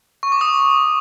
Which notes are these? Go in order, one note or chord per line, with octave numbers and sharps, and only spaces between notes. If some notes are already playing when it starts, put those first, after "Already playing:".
C#6
D6
D#6